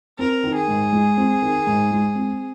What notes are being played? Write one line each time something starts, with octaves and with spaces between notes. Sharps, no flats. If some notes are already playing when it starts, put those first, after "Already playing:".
C4 A#4
D#3
G#4
G#2
G#3
C4
D#3
G#2
G#3
C4